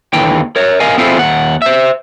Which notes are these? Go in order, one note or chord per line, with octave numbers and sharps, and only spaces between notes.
D#2 D3 E3 G5
A#4 C#5
A#4 D#5 F5 G#5
C4 E4 F4 G#4 A4 C5
D#2 F#5
C5 E5